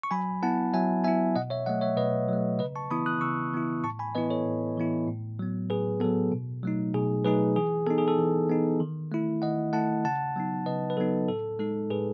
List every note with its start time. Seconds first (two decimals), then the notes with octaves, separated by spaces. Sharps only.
0.03 C#6
0.11 F#3 G#5 B5
0.43 B3 E4 F#5 A5
0.74 F#3 E5 G#5
1.04 B3 E4 E5 G#5
1.36 B2 D#5 F#5
1.50 C#5 E5
1.66 F#3 A3 D#5 F#5
1.81 C#5 E5
1.97 B2 B4 D#5
2.29 F#3 A3
2.59 C#3 B4 D#5
2.76 A5 C#6
2.91 E3 B3 E4 B5 D#6
3.06 D#6 F#6
3.21 C#3 C#6 E6
3.53 E3 B3 E4
3.84 A2 A5 C#6
3.99 G#5 B5
4.15 E3 B3 E4 B4 D#5
4.30 A4 C#5
4.46 A2
4.77 E3 B3 E4
5.08 A2
5.39 F#3 B3
5.70 A2 G#4 B4
6.00 F#3 B3 A4
6.32 B2
6.63 F#3 A3 D#4
6.94 B2 G#4
7.25 F#3 A3 D#4 G#4 B4
7.56 E3 G#4
7.87 B3 D#4 A4
7.98 G#4
8.08 A4
8.18 E3
8.50 B3 D#4
8.80 D#3
9.12 A3 E4
9.42 D#3 D#5 F#5
9.73 A3 E4 F#5 A5
10.05 C#3 F#5 A5
10.36 F#3 B3 D#4
10.66 C#3 B4 D#5
10.90 B4
10.97 F#3 B3 D#4 A4
11.29 A2 A4
11.59 G#3 D#4 A4
11.90 A2 G#4 B4